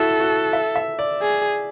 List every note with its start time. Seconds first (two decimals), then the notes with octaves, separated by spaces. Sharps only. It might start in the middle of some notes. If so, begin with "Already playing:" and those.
Already playing: E4 F#4 A4
0.20 F#4
0.53 E5
0.76 E5
0.99 D5
1.22 G#4